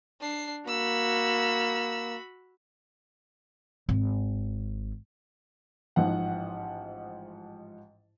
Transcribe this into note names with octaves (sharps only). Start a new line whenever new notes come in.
D4 C7
A#3 F#4 B5 E6
G#1
A1 G#2 F3 F#5